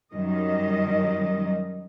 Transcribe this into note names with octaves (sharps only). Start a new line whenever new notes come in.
F#2 D#3 G3 D#5